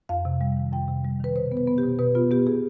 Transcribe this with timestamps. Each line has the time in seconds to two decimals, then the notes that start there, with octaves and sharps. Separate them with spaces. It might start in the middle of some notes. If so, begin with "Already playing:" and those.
0.09 F2 F5
0.25 C3
0.41 G3
0.57 D#3
0.72 F2 G5
0.88 C3
1.04 G3
1.21 D#3 B4
1.36 B2 C5
1.52 B3
1.57 B4
1.67 B3
1.78 G4
1.83 B2
1.99 B2 B4
2.15 B3 F4
2.31 B3 G4
2.46 B2 G#4